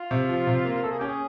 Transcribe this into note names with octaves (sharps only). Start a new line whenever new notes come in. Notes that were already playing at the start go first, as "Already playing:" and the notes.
Already playing: F4
C3
F3
C3
A#3
A#3 A4
G#4
C#4 G4
G#4